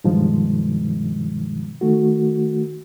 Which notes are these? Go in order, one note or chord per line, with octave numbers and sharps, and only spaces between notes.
G2 B2 D#3 F3 G#3
D#3 A3 F#4